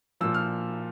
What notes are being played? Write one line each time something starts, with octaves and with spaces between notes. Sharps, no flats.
A#2 F3 E6
F6